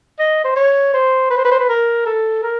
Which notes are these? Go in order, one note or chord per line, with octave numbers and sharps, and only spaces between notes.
D#5
C5
C#5
C5
B4
C5
B4
C5
B4
A#4
A4
A#4